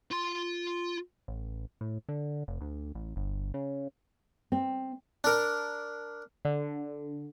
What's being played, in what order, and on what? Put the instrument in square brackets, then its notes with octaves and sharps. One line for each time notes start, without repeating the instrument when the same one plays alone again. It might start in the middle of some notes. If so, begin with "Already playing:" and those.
[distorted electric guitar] F4 C6
[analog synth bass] A1
A2
D3
F1
D2
A1
G1
C#3
[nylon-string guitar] C4
[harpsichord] D4 A#4
[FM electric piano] D3